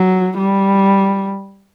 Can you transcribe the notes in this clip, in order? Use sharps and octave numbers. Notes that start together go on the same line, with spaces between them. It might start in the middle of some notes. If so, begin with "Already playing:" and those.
Already playing: F#3
G3